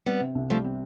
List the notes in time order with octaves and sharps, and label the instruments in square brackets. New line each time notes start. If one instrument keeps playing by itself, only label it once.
[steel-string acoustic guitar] G3 B3 [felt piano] C4
[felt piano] C3
C2
[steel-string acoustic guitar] F3 A3 [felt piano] G3
[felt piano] C4